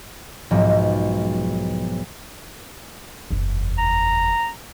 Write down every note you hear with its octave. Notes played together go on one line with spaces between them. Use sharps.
B1 G#2 F3
F#1 E2
A#5